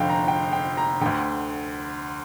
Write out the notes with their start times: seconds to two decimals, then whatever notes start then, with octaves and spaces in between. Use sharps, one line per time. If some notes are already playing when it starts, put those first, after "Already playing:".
Already playing: F1 F2 D3 F5 G5
0.09 A#5
0.28 G5
0.53 G5
0.77 A#5
1.01 D2 D3 G5